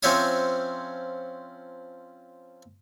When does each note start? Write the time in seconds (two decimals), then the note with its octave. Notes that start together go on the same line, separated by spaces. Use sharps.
0.03 F3 C4 C#4 C#5 E5 D#6